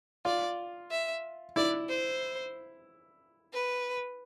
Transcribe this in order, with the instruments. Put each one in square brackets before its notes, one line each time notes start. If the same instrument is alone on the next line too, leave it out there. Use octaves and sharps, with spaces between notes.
[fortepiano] F4 [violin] D5
[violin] E5
[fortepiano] E4 [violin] D5
[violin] C5
B4